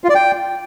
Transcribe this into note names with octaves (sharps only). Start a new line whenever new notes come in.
F4
D5
G5